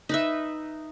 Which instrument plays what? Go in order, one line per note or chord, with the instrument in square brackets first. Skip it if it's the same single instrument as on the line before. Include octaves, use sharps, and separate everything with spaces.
[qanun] D#4 B4 E5